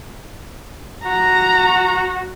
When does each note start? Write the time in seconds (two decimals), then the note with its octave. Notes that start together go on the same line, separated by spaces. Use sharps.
1.05 F#4 A#5